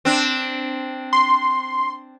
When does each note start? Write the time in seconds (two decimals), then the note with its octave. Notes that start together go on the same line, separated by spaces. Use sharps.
0.05 C4 D4
1.13 C6